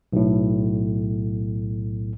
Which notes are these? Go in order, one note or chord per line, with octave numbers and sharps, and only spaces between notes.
B1 A2